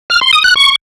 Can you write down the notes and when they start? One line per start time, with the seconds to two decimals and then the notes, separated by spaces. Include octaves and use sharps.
0.10 F6
0.21 C6
0.33 D#6
0.44 F#6
0.56 C#6